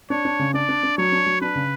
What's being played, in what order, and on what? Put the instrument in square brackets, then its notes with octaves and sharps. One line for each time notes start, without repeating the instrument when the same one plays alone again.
[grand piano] D4 [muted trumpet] C#5
[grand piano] D4
C#3
[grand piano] D4 [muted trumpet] D5
[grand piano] D4
D4
[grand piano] F#3 [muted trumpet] C#5
[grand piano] D4
F#3
[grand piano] D4 [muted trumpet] B4
[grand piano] C#3